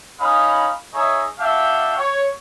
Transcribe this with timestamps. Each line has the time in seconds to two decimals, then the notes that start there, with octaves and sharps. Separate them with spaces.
0.20 C#4 D#4 F5 B5 D#6
0.94 D#4 G#4 C#5 D#5 E5
1.39 D4 F#4 E5 F5 G5
1.96 C#5